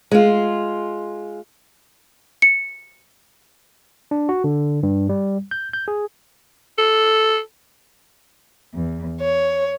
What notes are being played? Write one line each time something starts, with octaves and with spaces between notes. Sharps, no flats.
G#3 F4
C#7
D4
F#4
D3
G2
G3
G6
G6
G#4
A4
E2
C#5